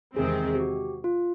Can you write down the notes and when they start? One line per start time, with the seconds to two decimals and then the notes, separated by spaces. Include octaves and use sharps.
0.16 E2 C3 D#3 G#3 C4 G#4
0.55 G4
0.60 F#4
1.04 F4